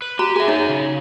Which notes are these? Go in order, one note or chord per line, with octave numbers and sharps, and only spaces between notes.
B4
F#4 G4 A#5
F#3 G#4 E5 G#5
D#4 C#5
C#3